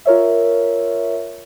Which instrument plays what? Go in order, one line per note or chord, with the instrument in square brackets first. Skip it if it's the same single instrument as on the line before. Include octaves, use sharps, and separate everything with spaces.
[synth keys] F4 A#4 C#5 E5